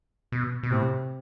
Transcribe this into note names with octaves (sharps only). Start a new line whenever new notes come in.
B2
B2
A2 C3